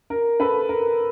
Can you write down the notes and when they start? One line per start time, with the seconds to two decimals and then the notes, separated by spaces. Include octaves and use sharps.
0.10 A#4
0.40 A4 B4
0.69 A#4